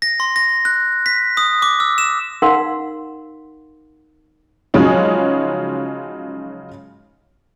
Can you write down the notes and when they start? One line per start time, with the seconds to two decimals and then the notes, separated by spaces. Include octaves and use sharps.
0.02 A#6
0.20 C6
0.36 A#6
0.65 F#6
1.06 B6
1.37 D#6
1.62 D6
1.80 E6
1.98 E7
2.42 D#4 A#4 F5 F#5 C6
4.74 C#3 F3 F#3 G#3 C#4 D#4